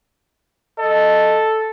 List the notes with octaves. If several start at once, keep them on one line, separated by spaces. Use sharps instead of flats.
A4 D#5